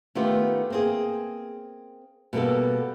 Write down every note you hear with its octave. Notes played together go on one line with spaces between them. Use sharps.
D#3 A3 B3 F4 G4
A#3 C4 G#4
B2 G3 A#3 B3 A4